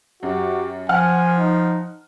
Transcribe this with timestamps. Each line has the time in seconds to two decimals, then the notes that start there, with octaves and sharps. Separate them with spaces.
0.23 F#2 F#4 G4
0.89 F3 F#5 G#5 F6
1.39 D#4